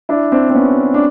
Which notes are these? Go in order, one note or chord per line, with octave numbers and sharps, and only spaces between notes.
D4 E4
C4 D4
C4
B3 C#4
D4